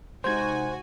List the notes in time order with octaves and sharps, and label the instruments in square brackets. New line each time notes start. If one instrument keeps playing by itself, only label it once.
[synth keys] C3 G#3 D#4 [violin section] F#4 G#5 [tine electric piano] C5 G#6